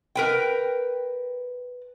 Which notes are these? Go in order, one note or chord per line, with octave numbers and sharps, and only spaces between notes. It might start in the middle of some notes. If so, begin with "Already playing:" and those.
A#4 B4 G5